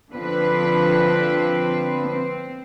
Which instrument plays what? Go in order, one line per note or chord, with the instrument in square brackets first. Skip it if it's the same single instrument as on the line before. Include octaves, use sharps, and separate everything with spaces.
[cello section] D3 F3 C4 B4
C4